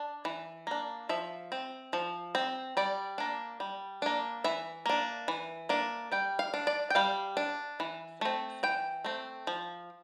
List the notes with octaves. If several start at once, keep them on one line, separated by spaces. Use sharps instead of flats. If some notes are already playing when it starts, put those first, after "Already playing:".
Already playing: D4
E3
A#3 D4
F3 E5
C4
F3
C4
G3 D5
A#3 D4
G3
A#3 D4
E3 E5
A#3 D4
E3
A#3 D4
G3 G5
F5
D4
D5
G5
G3 F5
D4
E3
A3 C4
E3 G5
A3 C4
F3